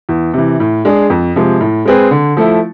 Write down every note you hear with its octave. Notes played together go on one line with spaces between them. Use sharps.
E2
C3 E3
A2
G#3 D4 G#4
F2
C3 F3 G#3
A2
G#3 C4 G#4 B4
D3
F3 A3 E4